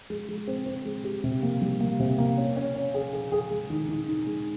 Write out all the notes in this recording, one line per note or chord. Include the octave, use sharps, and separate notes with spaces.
G#3
G#3
C4
C4
G#3
G4
C3
A#3
G3
A#3
C3
A#3
C#4
C#4
C#4
G#4
G#4
G#4
G#3
D#3
D#4
D#4
G#3